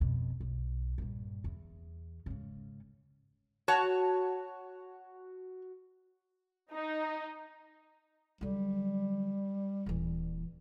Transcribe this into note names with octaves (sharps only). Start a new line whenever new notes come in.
F2 B2
B1
G2 A#2
E2
G#2 C#3
F#4 C#5 A5
D#4
D3 F#3 G3
D#1 E3